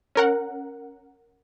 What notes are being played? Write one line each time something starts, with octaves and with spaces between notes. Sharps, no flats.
C#4 A#4 F#5